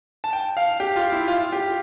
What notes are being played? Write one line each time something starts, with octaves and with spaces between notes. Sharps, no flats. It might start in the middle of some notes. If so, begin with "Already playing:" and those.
A5
G5
F5
G4
F4
E4
F4
G4